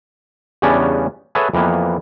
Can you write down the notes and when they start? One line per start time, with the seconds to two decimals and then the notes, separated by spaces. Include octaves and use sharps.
0.62 E2 C#3 G3 B3 C#4 D4
1.35 G#4 A4 B4 C#5 E5 F#5
1.54 F2 E3 A#3 B3